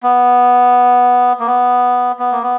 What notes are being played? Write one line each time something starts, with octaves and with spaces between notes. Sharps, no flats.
B3
A#3
B3
B3
A#3
B3